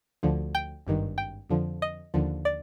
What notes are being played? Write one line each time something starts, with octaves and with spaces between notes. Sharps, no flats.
D2 D3 F3
G5
G#1 G2 D#3
G5
F2 D3 F3
D#5
D#2 D3 F3
D5